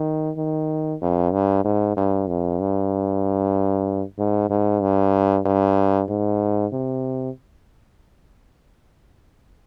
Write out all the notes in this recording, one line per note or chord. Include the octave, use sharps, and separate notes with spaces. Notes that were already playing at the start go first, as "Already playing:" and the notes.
Already playing: D#3
D#3
F2
G2
G#2
G2
F2
G2
G#2
G#2
G2
G2
G#2
C3